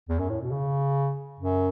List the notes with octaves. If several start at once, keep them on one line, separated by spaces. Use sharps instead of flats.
E2
F#2
A2
B2
C#3
F#2